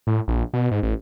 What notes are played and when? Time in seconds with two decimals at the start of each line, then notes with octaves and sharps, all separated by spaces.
0.07 A2
0.28 A#1
0.53 B2
0.71 G#2
0.83 A1